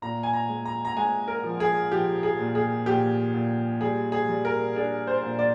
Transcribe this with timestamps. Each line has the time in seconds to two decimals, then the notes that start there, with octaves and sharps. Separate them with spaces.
0.02 A#2 A#5
0.23 G#5
0.33 A#5
0.49 G#3
0.66 A#5
0.85 A#5
0.97 G#3 G#5
1.28 A#4
1.44 F3
1.60 G#4
1.91 F3 G4
2.23 G#4
2.39 A#2
2.55 G#4
2.86 A#2 G4
3.33 A#2
3.81 G3 G#4
4.12 G#4
4.28 G3
4.45 A#4
4.76 D4 G#4
5.07 C5
5.23 A#2
5.39 D5